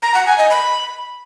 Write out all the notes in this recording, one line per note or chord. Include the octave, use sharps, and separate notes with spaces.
A#5
F#5
G#5
D#5
B5